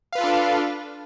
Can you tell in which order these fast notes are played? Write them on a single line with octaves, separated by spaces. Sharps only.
F5 B4 F4 A4 D4